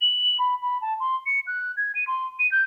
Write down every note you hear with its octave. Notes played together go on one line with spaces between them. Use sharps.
F#7
B5
B5
A5
C6
C#7
F#6
G#6
D#7
C6
D#7
G6